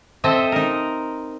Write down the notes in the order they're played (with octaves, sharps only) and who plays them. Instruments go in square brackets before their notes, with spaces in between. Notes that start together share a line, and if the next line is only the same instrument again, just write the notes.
[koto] C4 A4 C5 D#5 E5
D#4 A#4